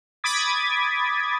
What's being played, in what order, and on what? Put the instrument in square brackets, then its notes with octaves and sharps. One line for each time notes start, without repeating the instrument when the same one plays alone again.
[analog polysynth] B5 D6 D#6 G#6 A6 B6